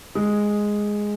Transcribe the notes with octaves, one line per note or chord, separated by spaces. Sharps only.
G#3